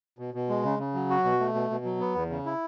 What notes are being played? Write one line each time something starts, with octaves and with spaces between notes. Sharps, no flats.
B2
B2
G#3
C#3
C#3
F#3
F#4
B2
A3
B2
B2
F#3
B3
E2
C#3
E4